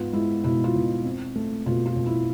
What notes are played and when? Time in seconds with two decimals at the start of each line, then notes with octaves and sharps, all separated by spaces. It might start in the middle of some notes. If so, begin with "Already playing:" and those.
Already playing: G#2 B3 F4
0.13 G#3 E4
0.44 B2 E4
0.64 F4
0.75 B2
1.05 C4
1.35 A3
1.66 B2 F4
1.86 F4
1.96 B2
2.06 E4